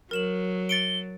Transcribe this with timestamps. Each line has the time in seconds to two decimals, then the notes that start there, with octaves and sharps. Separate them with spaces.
0.11 F#3 A#4 E7 F#7
0.69 A6 C#7 D7 G7